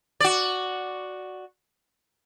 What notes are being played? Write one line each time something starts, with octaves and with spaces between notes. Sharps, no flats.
F#4 D5